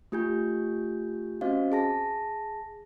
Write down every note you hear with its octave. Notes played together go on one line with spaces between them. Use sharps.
A3 F4 G4 G#5 G6
C4 C#4 F#4 C5 D#5 F5
G#4 A5 A#6